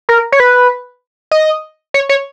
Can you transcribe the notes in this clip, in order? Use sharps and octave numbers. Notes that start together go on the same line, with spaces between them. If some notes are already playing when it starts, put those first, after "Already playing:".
A#4
C#5
B4
D#5
C#5
C#5